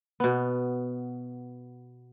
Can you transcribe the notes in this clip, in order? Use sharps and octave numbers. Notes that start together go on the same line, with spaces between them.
B2 B3